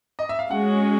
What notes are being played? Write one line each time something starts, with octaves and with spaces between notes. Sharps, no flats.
D#5
E5
F5
G#3 C#4 F#4 F#5